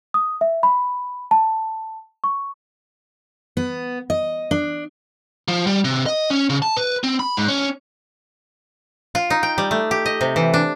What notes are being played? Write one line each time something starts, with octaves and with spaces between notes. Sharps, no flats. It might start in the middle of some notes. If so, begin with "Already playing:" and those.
D#6
E5
B5
A5
C#6
B3
D#5
D4
F3
G3
C3
D#5
C#4
C#3
A5
B4
C4
B5
G#2
C#4
F4
D#4
G5
G3
A3
G4
D#5
C3
E3
D4